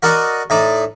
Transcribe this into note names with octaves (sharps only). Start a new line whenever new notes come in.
F#4 A#4 D5 D#5 F#5
A2 D#4 D5